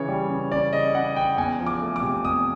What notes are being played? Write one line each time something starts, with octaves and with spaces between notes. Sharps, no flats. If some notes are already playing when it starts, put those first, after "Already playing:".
Already playing: C#3 E3 C#5
G3
C#3
C#3 D5
C#3 D#5
C#3 F#5
C#3 G5
E2 G#5
F3
D6
A3
D6
C3
E2 D#6